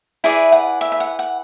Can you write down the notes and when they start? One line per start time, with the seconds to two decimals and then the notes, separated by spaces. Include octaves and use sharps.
0.24 E4 G#4 B4 D5 E5
0.52 F#5
0.81 E5
0.92 E5
1.00 F#5
1.19 F#5